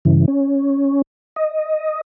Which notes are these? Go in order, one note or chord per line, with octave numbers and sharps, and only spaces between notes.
G2 C#3 E3
C#4
D#5